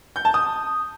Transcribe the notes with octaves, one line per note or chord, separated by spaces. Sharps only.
G6
A5
D#6